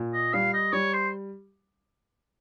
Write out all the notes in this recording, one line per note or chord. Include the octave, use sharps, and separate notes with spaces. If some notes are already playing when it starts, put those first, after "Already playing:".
Already playing: A#2
D#5
G3 F5
D#5
G3 C#5
C5